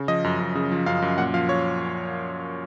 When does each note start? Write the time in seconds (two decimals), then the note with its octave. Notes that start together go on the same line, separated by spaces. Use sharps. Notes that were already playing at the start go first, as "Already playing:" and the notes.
Already playing: C#3
0.08 F3 D#5
0.24 F#2
0.40 F#2
0.55 C#3
0.72 F3
0.86 F#2 F5
1.02 F#2
1.18 A#2 F#5
1.34 F3 F5
1.49 C#5